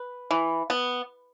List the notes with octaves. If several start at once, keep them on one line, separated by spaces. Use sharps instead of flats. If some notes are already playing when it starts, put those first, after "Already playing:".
Already playing: B4
E3
B3